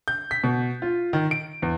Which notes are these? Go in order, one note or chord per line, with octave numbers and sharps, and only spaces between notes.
G6
B6
B2
F4
D#3
D7
E2